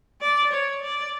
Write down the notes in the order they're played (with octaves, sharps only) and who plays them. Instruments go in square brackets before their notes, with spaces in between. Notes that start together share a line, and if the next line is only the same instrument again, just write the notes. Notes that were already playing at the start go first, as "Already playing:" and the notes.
[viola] D5
C#5
D5